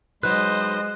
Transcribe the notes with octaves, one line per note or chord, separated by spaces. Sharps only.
F#3 G#3 D#4 B4 C5 D#5 F#6